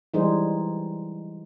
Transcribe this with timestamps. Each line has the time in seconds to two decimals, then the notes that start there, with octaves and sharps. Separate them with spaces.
0.14 E3 G3 G#3 D#4 G#4 C5